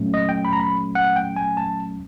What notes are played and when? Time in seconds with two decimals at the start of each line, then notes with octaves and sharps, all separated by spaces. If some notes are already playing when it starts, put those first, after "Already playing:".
Already playing: A#2 F#3 A3 C#4
0.14 D#5
0.29 G5
0.45 B5
0.53 A#5
0.60 B5
0.95 F#5
1.16 G5
1.36 G#5
1.57 A5